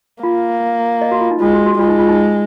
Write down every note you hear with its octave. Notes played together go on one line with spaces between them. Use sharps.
A#3 F4
D#5
F#4
F4
D#4
G#3 F4
F#4
F#4
G#3 F4
D#4
F4
D#4